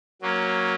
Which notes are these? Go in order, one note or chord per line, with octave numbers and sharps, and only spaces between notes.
F#3 A#3 C#4